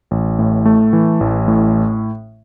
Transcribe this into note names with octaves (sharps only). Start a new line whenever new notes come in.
A1
A2
A3
E3
A1
A2